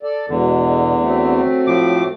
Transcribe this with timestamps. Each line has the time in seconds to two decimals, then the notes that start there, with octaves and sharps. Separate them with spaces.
0.03 A4 D5
0.30 E2 B2 D3 G#3
1.00 F#3 A3 C4
1.67 A2 F3 D6